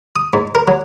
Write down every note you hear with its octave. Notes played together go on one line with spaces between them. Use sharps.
D#6
G#2
A#4
F#3